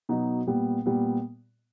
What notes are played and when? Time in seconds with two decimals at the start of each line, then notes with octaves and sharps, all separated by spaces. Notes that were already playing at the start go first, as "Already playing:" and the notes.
0.09 B2 F#3 B3 D#4 F#4
0.47 A#2 G3 B3
0.86 A#2 G3 B3